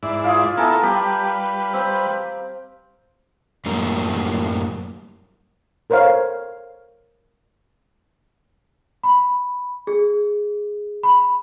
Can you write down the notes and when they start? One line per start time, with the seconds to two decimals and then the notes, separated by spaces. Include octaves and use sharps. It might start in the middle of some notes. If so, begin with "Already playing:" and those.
0.03 G#2 E4 D5
0.24 F4 G#4
0.57 B3 E4 A4 A#4 G#5 A5
0.83 G3 G4 B4
1.74 C4
3.66 F#2 A2 G3 A#3
5.90 A4 A#4 C5 C#5 F5
9.04 B5
9.87 G#4
11.03 B5